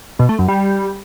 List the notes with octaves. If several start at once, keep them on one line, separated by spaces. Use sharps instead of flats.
B2
A3
F#2
G3